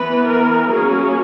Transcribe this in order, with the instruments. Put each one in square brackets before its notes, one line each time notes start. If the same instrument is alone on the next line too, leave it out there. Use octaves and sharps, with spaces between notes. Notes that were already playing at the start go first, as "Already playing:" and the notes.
Already playing: [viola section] E3 B3 B4
A#4
F#3 A#3 C#4 G#4